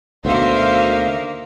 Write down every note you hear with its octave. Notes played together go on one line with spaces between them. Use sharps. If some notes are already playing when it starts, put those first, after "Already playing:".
D2 B2 D#3 A#3 C5 E5 F5